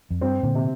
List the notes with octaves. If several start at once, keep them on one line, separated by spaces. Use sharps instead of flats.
F2
G2 C4
A#2 D3
C3